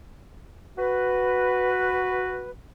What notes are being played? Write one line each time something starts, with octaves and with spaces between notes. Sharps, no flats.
F#4 B4